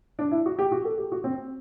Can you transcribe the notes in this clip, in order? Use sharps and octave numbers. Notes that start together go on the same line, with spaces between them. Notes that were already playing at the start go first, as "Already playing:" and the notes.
D4
E4
F#4
G4
F#4
A4
G4
F#4
C4